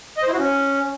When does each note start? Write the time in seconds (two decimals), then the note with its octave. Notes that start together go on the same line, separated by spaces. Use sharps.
0.17 D#5
0.23 C5
0.28 E4
0.33 F#4
0.38 C#4